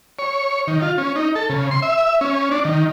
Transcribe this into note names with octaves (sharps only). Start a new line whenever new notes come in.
C#5
D#3
F4
C#4
D#4
A4
C#3
C6
E5
C#4
D4
D#3